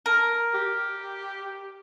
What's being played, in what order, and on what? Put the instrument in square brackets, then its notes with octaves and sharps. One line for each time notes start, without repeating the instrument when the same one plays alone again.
[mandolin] A#4
[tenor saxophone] G4